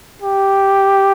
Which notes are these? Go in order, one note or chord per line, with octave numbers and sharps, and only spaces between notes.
G4